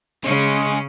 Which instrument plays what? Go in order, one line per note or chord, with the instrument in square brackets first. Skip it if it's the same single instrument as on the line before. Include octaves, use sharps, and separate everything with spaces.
[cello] C#3 C#4 [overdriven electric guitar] G#3